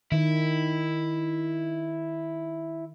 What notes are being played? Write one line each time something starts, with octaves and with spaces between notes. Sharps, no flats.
D#3 E4